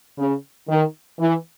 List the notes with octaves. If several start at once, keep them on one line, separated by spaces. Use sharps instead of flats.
C#3
D#3
E3